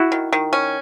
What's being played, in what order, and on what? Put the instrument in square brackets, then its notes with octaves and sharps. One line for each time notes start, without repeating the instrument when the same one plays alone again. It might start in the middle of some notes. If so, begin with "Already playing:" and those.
Already playing: [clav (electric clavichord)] E4 F#4
[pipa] D#3
D#3
C#4